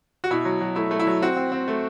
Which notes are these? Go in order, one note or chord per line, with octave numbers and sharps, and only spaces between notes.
F#4
B2 E4
F#3
F#3
A3 E4
A3
E4
F#3
C4 F#4
C4
C4
A3